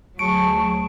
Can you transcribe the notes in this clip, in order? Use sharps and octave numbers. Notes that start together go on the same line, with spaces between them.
D2 F#3 G#4 A5 C#6 C#7 D7